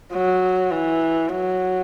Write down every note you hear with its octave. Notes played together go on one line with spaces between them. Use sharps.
F#3
E3
F#3